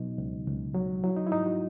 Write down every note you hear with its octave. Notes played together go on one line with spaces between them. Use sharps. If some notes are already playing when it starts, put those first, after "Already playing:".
Already playing: B2 F#3 D#4
C#2
C#2
F#3
F#3 E4
D#4
E4
G#2 D#4
F#4